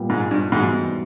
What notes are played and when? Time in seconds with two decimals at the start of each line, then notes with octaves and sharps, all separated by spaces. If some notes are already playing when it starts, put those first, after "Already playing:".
Already playing: A#2 G3 B3
0.10 G#2
0.31 G2
0.52 E2 G#2 B2 G3 B3 D#4